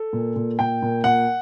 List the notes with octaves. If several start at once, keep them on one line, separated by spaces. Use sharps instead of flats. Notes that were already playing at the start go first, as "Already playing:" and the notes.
Already playing: A4
A#2
A#2
A#2 G5
A#2
A#2 F#5